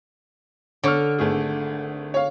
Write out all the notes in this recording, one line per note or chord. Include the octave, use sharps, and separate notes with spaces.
D3 C#5 C#6 F6
G#1 A3 G#4
C#5 F5